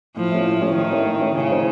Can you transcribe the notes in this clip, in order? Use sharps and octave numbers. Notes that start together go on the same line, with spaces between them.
A2 F3
A3 C#4
A2
A3 C#4
A2 D#3
A3 C#4
A2
A3 C#4
A2 C#3
F3 C4 D#4